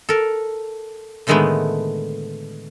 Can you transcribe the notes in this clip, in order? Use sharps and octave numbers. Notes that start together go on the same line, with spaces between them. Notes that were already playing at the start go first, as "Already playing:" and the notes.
A4 A#4
A2 D3 D#3 G#3 A3 B3